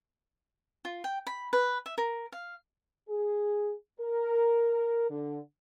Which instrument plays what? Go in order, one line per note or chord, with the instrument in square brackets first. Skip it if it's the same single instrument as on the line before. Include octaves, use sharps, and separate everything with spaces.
[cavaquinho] F4
G5
B5
B4
E5
A#4
F5
[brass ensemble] G#4
A#4
D3